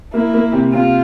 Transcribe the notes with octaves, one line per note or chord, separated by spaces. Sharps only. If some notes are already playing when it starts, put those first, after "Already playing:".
A#3 E4
A#3
C3
C3 F4